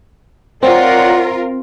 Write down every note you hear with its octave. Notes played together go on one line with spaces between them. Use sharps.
C4 F4 A#4 C#5 D5 F#5